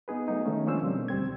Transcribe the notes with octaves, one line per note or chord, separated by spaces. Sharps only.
B3 D#4 G#4 B4
F#3 A3 B3 D#4
D#3 G#3 A3 C#4
F3 A#3 C#4 D4 C5 E6
B2 G3 C4
D2 G3 C4 G#6